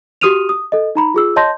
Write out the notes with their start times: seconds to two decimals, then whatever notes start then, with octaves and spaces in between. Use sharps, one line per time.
0.21 F#4 G4 D#6 F6 D#7 F7
0.49 D#6
0.72 A4 D#5
0.95 D#4 A#5 B5
1.14 F4 G#4 E6
1.36 C#5 D#5 A5 C6 G6 A#6